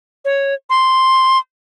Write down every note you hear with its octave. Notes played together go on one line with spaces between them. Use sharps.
C#5
C6